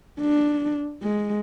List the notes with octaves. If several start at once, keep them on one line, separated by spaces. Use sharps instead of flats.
D4
G#3